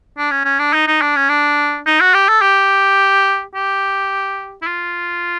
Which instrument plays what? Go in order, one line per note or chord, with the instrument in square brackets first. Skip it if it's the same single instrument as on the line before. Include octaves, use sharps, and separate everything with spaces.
[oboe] D4
C#4
C#4
D4
D#4
D#4
D4
C#4
D4
D#4
F#4
G4
A4
G4
G4
E4
F4